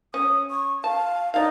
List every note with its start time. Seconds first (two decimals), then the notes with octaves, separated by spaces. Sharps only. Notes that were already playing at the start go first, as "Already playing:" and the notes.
0.14 C#4 D#6
0.50 C#6
0.84 F5 A5
1.34 D#4 D5 F5